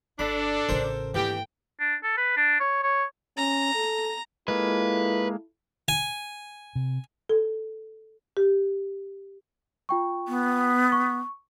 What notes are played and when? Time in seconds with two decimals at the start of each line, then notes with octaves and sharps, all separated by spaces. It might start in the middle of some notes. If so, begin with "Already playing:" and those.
0.19 G1 D4 A4 B5
0.69 A1 C#3 A#4 C5 G5
1.14 G#1 E3 A#3 B3 D4 G4 G5
1.80 D4
2.03 A4
2.17 B4
2.37 D4
2.60 C#5
2.83 C#5
3.37 C#4 A#5
3.75 A4
4.48 G#3 A#3 E4 F4 A4 B4
5.88 G#5
6.75 C3
7.29 A4
8.37 G4
9.89 F4 G5 C#6
10.28 B3
10.92 C#6